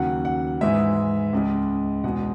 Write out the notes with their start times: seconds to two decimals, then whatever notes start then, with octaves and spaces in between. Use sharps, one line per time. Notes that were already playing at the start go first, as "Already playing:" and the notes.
Already playing: D#2 C#3 F#3 F#5
0.25 F#5
0.61 G#2 E3 G#3 E5
1.33 C#2 C#3 G#3
2.04 E2 B2 G#3 F#5